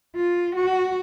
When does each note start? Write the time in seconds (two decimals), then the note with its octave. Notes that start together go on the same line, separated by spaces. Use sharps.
0.16 F4
0.56 F#4